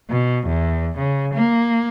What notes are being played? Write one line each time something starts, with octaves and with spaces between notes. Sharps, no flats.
B2
E2
C#3
A#3